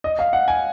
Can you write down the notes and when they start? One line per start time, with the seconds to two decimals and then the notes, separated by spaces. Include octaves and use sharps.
0.04 D#5
0.19 F5
0.33 F#5
0.48 G#5